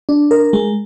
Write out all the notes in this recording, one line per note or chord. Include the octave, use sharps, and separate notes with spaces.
D4
A#4
G#3